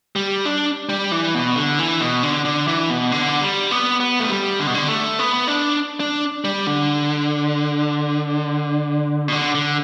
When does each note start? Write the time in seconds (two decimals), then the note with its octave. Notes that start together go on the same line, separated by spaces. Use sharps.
0.16 G3
0.45 D4
0.89 G3
1.12 E3
1.35 B2
1.56 D3
1.79 E3
2.00 B2
2.23 D3
2.45 D3
2.68 E3
2.90 B2
3.12 D3
3.41 G3
3.71 B3
4.00 B3
4.20 A3
4.30 G3
4.59 D3
4.67 B2
4.74 D3
4.88 A3
5.19 B3
5.48 D4
6.00 D4
6.44 G3
6.67 D3
9.28 B2
9.32 D3
9.55 D3